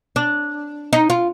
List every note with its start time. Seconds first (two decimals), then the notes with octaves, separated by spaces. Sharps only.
0.16 D4
0.93 D#4
1.10 F4